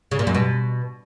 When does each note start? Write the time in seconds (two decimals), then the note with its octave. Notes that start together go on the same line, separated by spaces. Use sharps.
0.11 C#3
0.19 A#2
0.27 F#2
0.35 B2